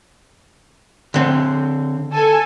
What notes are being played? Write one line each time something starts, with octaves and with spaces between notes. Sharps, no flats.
D3 C4
A4 G#5